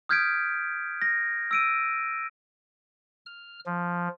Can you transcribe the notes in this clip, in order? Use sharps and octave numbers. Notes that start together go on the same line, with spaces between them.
D#6 F6 G6 G#6 B6 D7
A#6
E6 D7 D#7
F6
F3